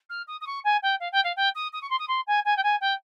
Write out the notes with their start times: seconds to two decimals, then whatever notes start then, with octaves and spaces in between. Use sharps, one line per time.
0.09 F6
0.27 D#6
0.41 D#6
0.47 C#6
0.64 G#5
0.82 G5
1.00 F5
1.12 G5
1.24 F5
1.36 G5
1.55 D#6
1.73 D#6
1.82 C#6
1.90 C6
1.99 D#6
2.08 C6
2.27 G#5
2.45 G#5
2.57 G5
2.63 G#5
2.81 G5